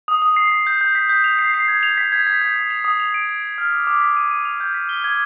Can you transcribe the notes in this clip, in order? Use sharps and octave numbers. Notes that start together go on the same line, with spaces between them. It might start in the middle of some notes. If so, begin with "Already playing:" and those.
D#6
D#6
C7
B6
G6
G6
B6
G6
F7
C7
C7
G#6
F7
B6
G#6
B6
G6
D#6
F7
D#6
F7
D7
D7
D7
F6
D6
D6
B6
D#7
D#7
F7
G6
B6
G7
G#6